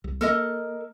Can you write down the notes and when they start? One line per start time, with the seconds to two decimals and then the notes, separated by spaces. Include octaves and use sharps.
0.04 C2
0.21 A#3 A4 A#4 D#5